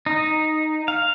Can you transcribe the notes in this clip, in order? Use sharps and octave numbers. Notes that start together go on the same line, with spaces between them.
D#4
F5